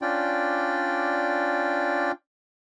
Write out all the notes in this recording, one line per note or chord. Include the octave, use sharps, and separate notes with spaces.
C#4 D4 F4 D5 G5